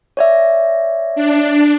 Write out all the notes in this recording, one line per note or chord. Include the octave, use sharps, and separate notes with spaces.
C#5 D5 E5
D4